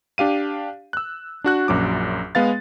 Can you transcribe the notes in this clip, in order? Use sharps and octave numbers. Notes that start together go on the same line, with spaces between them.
D4 G4 F5 D#7
E6 F#6
D4 F#4 F#6
A#1 F#2 F#3 D6
G#3 B3 F5 A6